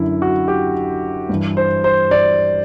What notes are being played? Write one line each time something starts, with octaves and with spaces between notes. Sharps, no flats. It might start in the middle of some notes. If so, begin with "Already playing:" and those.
Already playing: F#2 D3 E4
F#4
G4
G2 E3
C5
C5
D5